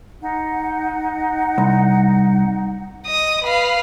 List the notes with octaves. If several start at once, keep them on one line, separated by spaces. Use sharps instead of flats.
D#4 F#5
C2
D#5 D#6
B4 F5